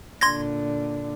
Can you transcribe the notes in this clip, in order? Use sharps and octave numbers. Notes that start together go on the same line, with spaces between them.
A#2 D3 C6 G#6 A#6